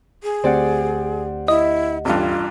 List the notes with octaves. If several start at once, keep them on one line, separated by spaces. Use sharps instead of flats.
G#4
D2 C4 G4 D5 F#5
E4 D#5
A1 G2 F4